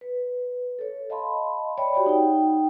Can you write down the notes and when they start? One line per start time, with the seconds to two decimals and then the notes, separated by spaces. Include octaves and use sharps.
0.01 B4
0.79 A4 C#5
1.10 D#5 F5 A5 B5 C6
1.78 C#5 D5 E5 G5 B5
1.94 F#4 G4 C#5 D5 E5 G5
2.06 D#4 F#5 G5